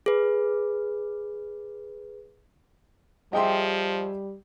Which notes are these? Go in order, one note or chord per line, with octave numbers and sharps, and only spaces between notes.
G#4 B4
F3 G3 G4 G#4 D#5 E5 G5 C6